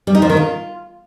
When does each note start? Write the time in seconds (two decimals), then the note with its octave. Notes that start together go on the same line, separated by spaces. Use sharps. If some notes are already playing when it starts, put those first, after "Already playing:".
0.07 G3
0.15 D#4
0.22 F3
0.29 D#3
0.37 F4